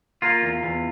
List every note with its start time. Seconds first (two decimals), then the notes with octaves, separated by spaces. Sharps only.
0.22 A#3 F4
0.42 E2
0.63 E2